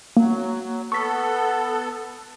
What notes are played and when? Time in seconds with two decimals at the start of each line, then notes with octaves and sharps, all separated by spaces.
0.17 F#3 A#3
0.92 B3 A4 C#6 B6